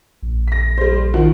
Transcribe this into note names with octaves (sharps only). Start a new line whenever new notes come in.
A#1
A#6 B6
G3 C5
D#3 F3 F#4